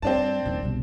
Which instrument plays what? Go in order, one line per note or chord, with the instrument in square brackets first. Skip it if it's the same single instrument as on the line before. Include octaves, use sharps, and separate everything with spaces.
[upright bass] G2 [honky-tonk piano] C4 D4 A5
[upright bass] D#1 D#3
C2 B2